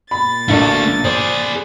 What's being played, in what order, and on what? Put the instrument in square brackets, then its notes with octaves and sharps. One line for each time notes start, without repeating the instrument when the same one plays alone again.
[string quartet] A#2 A6 [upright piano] B5
[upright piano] A#1 F4 [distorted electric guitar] A3 D4
[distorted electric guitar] G#4 D5 [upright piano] C5